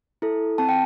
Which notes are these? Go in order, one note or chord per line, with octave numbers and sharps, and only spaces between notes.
E4 A4
C4 A5
G5